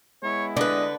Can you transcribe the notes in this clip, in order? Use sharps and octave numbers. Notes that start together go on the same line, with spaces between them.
G#3 B3 E4 C#5
D3 D4 B4 D#5